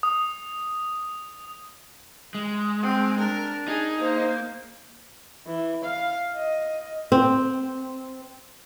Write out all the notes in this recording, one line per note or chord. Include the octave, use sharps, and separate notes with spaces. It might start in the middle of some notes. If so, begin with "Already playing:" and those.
D#6
G#3
C4
D4 A#4
D#4 G#4
A#3 C5
E3
F5
D#5
C4